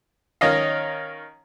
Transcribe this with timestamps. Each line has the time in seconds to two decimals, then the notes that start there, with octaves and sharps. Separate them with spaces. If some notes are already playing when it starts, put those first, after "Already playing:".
0.41 D#3 C#4 D#5 F5